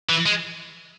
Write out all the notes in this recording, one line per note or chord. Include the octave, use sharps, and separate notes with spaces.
E3
G#3